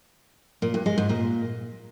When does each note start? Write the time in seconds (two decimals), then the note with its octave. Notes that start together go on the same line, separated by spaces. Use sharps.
0.62 A#2
0.74 G2
0.86 G#3
0.98 G#2
1.09 A#2